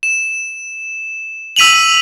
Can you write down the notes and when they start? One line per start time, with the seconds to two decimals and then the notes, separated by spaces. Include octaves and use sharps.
0.03 E7
1.56 E6 B6 D#7 F7 F#7